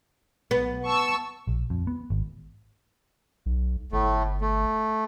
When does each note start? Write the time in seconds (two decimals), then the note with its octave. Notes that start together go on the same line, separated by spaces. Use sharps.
0.51 B1 B3
0.84 A5 C#6 E6
1.47 A#1
1.70 F2
1.87 B3
2.10 G#1
3.46 B1
3.92 G1 A2 A3
4.41 A3